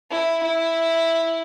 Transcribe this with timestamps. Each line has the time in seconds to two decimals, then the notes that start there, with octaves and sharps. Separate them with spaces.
0.11 E4
0.43 E4